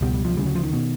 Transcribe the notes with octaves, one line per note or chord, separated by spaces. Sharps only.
C#2 B2 G3
G3
F3
D2 C#3 G3
F#3
F3
D#3
B2